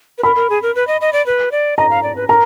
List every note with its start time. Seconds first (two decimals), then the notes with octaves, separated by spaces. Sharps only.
0.18 B4
0.23 A#4 B5
0.36 A#4
0.50 G#4
0.62 A#4
0.75 B4
0.87 D#5
1.01 D#5
1.13 D5
1.26 B4
1.52 D5
1.77 D#5 A#5
1.90 F5
2.03 D5
2.16 B4
2.28 A#4 A#5